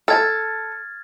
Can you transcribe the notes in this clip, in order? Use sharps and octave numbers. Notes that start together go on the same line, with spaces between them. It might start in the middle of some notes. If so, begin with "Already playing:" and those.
A4 F6 G#6 A6